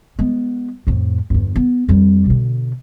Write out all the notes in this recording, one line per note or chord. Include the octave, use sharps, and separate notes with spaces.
G#3 B3
F2 A2
G1 E2
B3
F2 G3
B2 D3